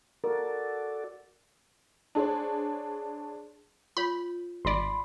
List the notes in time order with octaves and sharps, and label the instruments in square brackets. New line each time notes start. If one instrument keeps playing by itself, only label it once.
[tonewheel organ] F#4 A4 D5 [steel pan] A#4
[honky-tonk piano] D4 G#4 C5 C#5
[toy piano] F4 C#5 [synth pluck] B5
[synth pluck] G#1 D5 [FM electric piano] B5 C6